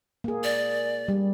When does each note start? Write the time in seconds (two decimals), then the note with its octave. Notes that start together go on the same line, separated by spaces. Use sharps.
0.24 A#3 G#4
0.44 D5
1.08 G3